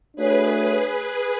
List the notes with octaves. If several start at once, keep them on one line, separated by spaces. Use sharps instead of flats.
A3 D4 F#4 G#4 B4 C#5